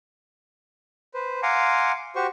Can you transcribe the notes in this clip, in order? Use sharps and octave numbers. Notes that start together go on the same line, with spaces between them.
B4 C5
F5 F#5 G#5 A#5 C6 D6
F#4 G4 C5 C#6